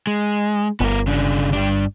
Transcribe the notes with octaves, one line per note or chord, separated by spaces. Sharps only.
G#3
G1 B3 A#4
C#3 D4
G2 D4